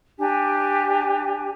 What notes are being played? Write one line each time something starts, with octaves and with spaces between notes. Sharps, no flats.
D4 G4 G#5